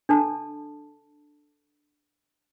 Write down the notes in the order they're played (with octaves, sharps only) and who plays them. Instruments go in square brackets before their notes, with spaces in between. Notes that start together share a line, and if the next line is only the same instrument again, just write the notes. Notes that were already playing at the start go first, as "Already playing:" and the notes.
[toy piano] D4 A4 A5